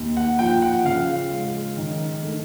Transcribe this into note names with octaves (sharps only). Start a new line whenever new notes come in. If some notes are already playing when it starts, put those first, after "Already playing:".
Already playing: D#2
F#5
F3 G5
F#5
C#3 F5
G#3
D#3
A3